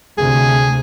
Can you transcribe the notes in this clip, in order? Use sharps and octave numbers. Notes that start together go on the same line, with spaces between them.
D2 C3 G#4